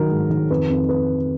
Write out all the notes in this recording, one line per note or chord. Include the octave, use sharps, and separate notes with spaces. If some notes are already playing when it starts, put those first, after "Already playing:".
Already playing: D#3 F#3 A#4
G#2
D#3
F2 B4
F2
B4